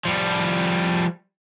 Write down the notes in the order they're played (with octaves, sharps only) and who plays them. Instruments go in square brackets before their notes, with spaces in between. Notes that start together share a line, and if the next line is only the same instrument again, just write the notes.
[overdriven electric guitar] F3 G3